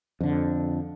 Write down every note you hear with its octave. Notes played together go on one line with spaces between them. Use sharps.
F2 D3